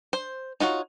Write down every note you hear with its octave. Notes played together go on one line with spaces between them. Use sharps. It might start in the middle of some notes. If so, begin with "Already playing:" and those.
C5
D#4 F4 F#4 C#5